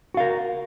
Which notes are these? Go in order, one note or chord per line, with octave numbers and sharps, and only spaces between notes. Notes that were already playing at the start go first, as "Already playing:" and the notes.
F#4 A#4 F5